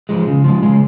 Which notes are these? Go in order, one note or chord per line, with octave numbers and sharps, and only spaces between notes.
F3 G#3
C#3
F3 G#3
C#3 G#3